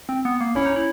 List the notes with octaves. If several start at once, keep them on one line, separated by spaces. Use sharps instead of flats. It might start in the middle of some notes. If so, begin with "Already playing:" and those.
C4
B3
A#3
C#4 E4
D#4
E4